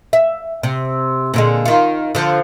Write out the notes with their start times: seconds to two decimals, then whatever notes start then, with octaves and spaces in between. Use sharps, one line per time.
0.13 E5
0.63 C3
1.34 A#2 D3 G#3
1.65 D#3 F4
2.15 D3 F3